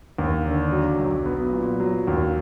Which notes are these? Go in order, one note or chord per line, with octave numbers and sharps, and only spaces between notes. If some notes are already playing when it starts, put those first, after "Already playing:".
D#2
D3
F#3
B1
B3
A#2
F#3
D#2